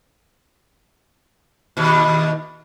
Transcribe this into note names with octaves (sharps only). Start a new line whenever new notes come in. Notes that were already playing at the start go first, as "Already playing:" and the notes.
D#2 B2